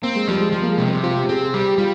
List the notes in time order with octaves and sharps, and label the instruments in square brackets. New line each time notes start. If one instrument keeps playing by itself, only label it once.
[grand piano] A#3 [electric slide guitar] C4
[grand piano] G#3
[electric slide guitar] F3 [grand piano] G3
[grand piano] G#3
[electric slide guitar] F3 [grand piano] G3
[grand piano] A#3
G#3
[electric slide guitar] C3
[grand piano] C4
[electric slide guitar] C4 [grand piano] F4
[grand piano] G4
[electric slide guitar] C4 [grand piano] G#4
[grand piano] G#4
[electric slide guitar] G3 [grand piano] G4
[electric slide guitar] G3 [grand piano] F4